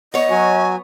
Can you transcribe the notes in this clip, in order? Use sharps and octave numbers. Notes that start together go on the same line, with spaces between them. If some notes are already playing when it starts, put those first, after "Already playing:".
B3 C#5 D#5
F#3 F#4 G#5